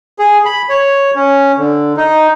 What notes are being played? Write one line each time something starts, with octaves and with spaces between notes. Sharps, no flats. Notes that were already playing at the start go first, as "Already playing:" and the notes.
G#4
B5
C#5
C#4
D3
D#4